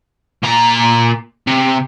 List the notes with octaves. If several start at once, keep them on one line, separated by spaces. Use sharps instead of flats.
A#2 A#5
C3